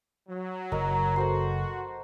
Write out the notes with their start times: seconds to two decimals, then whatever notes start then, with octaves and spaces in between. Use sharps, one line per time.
0.29 F#3
0.72 F#1 A#4 D#5
1.16 F#4 A4 C5 C6